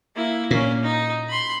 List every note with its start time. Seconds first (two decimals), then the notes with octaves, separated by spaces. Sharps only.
0.16 A#3 E4
0.51 A#2 A#3 C#4
0.83 D#4
1.30 B5 C6